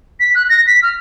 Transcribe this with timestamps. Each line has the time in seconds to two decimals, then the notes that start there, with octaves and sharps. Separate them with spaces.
0.20 B6
0.35 F#6
0.49 A#6
0.67 B6
0.83 F6